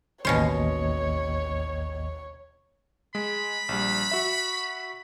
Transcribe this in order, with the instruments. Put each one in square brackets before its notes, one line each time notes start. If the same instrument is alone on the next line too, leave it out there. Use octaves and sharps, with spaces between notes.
[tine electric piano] A1 D#2 D#5 [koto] B2 C#4 C5 [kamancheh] C#5
[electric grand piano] G#3 [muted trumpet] B5
[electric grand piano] A#1 G3
F#4 E5